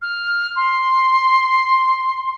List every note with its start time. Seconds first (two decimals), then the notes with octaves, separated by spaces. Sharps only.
0.02 F6
0.56 C6